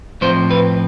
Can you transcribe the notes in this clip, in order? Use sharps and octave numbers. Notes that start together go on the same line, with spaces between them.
A2 F3 C4 C5
B4